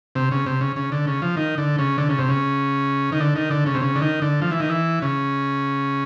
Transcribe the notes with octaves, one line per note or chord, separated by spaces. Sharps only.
C3
C#3
C3
C#3
C#3
D3
C#3
F3
D#3
D3
C#3
D3
C#3
C3
C#3
D#3
D3
D#3
D3
C#3
C3
C#3
D3
D#3
D3
F3
E3
D#3
E3
C#3